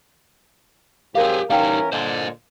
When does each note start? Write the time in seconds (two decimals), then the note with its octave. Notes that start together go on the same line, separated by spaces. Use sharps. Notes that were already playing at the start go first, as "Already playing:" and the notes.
1.15 G#2 F#3 C4 G4 G#4 A#4 F5
1.50 E3 G3 C#4 D#4 A#4 F5 G5
1.92 A#2 D3 C5 D#5